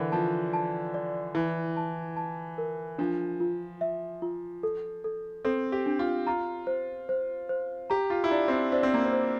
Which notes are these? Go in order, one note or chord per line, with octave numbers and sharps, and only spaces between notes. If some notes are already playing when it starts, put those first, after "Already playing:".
Already playing: D3 E3 A#4
F3 A5
A5
D5
E3 E4
A5
A5
A#4
F3 D4
F4
E5
F4
A4
A4
C4 A4
G4
D4
F4
F4 A#5
C5
C5
C5
G4 A#5
F4
E4
D4 A#5
C4
D4
D4 C5
C4
A#3
C4
C5